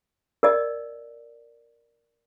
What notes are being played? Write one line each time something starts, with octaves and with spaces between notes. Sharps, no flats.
A#4 D5 D#5